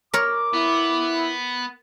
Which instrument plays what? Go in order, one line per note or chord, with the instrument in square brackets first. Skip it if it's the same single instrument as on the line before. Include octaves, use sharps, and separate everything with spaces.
[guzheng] A#4 C#5 [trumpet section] D6
[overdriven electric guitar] B3 [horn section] E4